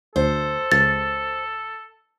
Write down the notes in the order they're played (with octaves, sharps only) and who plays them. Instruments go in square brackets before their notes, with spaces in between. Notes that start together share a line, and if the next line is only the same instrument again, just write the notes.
[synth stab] D2 [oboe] A4 [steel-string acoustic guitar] C5
[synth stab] C#2 [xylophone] A6